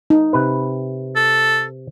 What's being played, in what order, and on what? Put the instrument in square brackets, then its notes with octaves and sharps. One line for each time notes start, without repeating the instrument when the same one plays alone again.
[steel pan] D#4
[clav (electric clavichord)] C3 B4
[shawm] A4